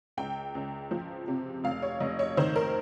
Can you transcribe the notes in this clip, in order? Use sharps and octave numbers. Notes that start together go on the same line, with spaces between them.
C#2 G5
C#2
F3
C3
F1 F5
C#5
F1 D#5
C#5
D#3 C5
A#4